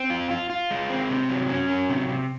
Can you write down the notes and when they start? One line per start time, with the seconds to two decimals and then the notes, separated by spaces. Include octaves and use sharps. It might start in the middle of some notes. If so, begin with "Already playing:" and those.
Already playing: C4
0.10 F4
0.31 F4
0.50 F4
0.71 G#3
0.90 C4
1.10 C3
1.29 F#3
1.49 C#4
1.69 F#3
1.90 C3
2.09 C3